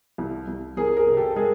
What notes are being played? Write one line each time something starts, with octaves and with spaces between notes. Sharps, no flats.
C2
C2
C2 G#4 A#4
G#4 A#4
C3
G4 A4
A4
G#3 G#4 A#4